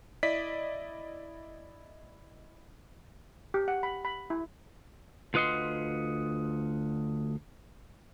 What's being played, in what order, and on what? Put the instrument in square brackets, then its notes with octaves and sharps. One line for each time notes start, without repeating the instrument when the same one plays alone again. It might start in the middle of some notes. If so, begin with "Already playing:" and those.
[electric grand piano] E4 D5 D#5 B6
[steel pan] G4
F#5
B5
B5
E4
[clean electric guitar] D2 F4 B4 D#5 F#5 C6